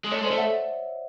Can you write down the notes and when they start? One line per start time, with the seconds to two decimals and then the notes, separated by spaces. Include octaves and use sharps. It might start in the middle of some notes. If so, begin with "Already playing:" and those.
0.04 G#3
0.11 A3 C#5 D#5
0.21 G#3 C5 D5
0.31 A3
0.37 E5 F#5